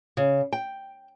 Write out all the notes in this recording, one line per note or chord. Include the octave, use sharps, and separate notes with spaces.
C#3
G5